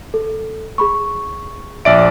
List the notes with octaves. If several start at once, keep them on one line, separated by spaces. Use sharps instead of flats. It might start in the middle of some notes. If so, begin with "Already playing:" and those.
A4
G#4 B5 C#6
A#1 D5 E5 D7